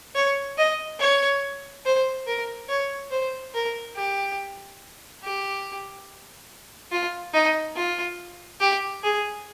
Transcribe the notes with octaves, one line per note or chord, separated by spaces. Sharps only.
C#5
D#5
C#5
C5
A#4
C#5
C5
A#4
G4
G4
F4
D#4
F4
G4
G#4